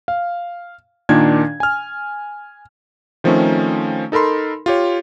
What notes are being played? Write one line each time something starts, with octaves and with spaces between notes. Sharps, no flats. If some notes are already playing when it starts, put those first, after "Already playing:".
F5
A#2 D#3 D4 G#6
G#5 F6
D#3 F3 A3 C4 C#4 D#4
D#4 A4 A#4 B5 C6
F4 G4 C#5